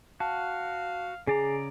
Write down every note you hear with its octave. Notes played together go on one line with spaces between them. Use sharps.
F#4 F5 A5
C#3 G#4 D5 G#5 A#5 C7